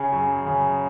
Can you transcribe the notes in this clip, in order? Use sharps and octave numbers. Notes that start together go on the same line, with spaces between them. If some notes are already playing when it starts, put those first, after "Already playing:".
Already playing: C#3 G#4
F#2
C#3